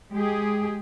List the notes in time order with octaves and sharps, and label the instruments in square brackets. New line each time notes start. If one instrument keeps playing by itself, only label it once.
[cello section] G#3 G4 G#4